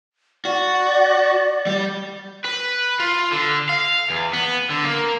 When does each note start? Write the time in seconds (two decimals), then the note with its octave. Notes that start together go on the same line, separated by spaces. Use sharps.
0.45 F#4 D5
1.67 G3
2.45 B4
3.00 F4
3.32 D3
3.69 F5
4.10 E2
4.33 B3
4.71 D3
4.85 A#3